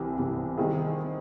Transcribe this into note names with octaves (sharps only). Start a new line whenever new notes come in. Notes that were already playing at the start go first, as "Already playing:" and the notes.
Already playing: C2 C3 E3
C2 C3 E3
D#3 G3 C4 E4 G#4